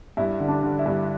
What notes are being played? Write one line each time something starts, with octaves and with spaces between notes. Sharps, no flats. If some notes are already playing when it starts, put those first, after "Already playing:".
G2 E4
D3
D4
D3
E4
G2